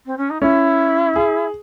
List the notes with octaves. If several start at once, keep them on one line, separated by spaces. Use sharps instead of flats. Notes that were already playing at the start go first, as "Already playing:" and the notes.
C4
C#4
D#4
C#4 E4
G#4